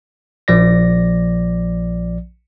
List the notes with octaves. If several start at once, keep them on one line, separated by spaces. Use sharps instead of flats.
A#1 F3 D5 A#6